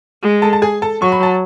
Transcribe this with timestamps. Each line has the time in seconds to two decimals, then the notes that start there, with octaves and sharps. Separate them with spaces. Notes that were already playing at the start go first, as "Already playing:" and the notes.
0.23 G#3
0.42 A4 A5
0.53 A5
0.62 G#4 G#5
0.82 A4 A5
1.02 F#3 C#6
1.12 B5
1.23 A5